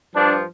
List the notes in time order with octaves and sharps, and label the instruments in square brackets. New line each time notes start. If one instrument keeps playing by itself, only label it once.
[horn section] G2 F3 D4